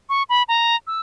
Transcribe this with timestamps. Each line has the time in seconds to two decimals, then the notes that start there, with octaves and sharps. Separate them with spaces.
0.09 C#6
0.29 B5
0.48 A#5
0.87 E6